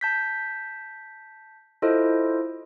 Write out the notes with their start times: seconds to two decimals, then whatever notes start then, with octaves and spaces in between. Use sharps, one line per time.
0.01 A5 G6 B6
1.82 E4 F4 A4 C5 D#5